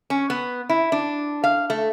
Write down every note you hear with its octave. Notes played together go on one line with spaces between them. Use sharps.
C#4
B3
E4
D4
F5
A3